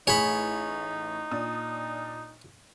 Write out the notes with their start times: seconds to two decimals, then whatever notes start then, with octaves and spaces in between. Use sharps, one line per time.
0.07 A1 A2 D#4 G#4 C#5 B5
1.31 A#2 D4 D#6